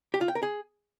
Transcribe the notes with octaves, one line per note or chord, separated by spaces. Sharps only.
G4
F4
G5
A#4
G#4